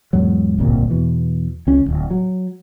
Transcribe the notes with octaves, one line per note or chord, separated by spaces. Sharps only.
E2 G#2 F#3
D1 G1 C2 A#2
E2 B2 E3
C#2 C#4
D1 B1
F#3